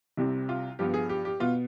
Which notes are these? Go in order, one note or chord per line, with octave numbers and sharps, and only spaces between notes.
C2 C3 G3 C4
F4
G2 F3 B3 G4
G#4
G4
G4
B2 B3 F4